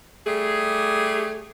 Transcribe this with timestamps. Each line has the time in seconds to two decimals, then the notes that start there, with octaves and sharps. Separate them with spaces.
0.27 G3 A3 G4 G#4